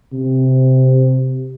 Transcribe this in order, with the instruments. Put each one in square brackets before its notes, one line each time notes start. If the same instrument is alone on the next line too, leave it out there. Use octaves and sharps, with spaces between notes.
[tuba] C3